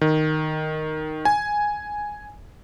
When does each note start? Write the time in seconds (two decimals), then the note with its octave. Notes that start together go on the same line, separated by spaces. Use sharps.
0.01 D#3
1.25 G#5